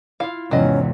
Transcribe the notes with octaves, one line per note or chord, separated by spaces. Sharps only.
E4 F4 F5
E2 G#2 C3 F#3 C#4 D#5